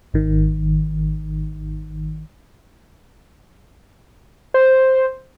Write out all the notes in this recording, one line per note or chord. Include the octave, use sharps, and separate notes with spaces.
G#1 D#3
C5